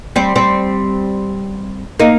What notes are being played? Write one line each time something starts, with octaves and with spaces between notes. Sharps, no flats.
G3 C4
G3 C4
A#3 D#4